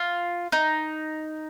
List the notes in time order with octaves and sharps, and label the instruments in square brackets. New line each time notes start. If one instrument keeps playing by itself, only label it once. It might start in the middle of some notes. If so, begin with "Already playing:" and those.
Already playing: [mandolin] F4
D#4